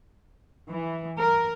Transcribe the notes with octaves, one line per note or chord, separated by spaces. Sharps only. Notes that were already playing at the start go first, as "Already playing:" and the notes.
E3
A#4